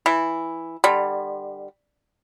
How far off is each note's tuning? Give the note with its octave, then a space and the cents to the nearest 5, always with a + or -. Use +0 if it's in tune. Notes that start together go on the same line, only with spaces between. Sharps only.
E3 +0 E4 +0
D3 +35 G3 +15